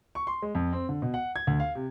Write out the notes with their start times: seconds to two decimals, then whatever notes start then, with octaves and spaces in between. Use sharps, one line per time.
0.15 C#6
0.27 C6
0.42 G#3
0.55 F2
0.73 C4
0.89 D3
1.02 B2
1.14 F#5
1.36 G#6
1.47 D2
1.60 F5
1.75 C3